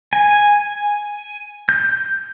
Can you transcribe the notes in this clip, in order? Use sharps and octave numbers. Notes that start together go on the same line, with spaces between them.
G#5
G6